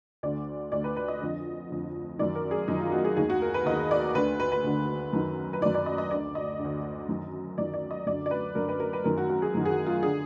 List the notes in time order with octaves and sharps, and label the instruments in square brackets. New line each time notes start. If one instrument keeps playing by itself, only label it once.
[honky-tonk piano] D2 D3 D5
D2 D3 D5
B4
B4
D#5
F2 D3
F2 D3
F#2 D#3 D5
A#4
G#4
F#2 D#3 D#4
F4
F#4
G#4
D#2 D#3 G#4
F#4
A#4
B4
D#2 D#3 D#5
D5
D2 D3 B4
B4
B4
D2 D3
F#2 D#3
B4
F#2 D#3 D5
D5
D#5
D#5
D2 D3 D5
D#5
D3
D2
F#2 D#3
F#2 D#3 D5
D5
D#5
F#2 D3 D5
D5
B4
F#2 D3 A#4
B4
A#4
B4
F#2 D#3 A#4
F#4
F#4
G#4
F#2 D#3
G#4
F#4
F4
D3 G#4